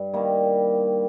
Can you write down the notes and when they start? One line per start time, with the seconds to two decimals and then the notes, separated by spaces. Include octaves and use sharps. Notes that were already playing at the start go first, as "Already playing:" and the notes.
Already playing: G2
0.14 D#3 G3 A#3